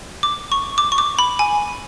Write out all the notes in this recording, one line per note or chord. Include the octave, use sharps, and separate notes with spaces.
D6
C#6
D6
C#6
D6
B5
G#5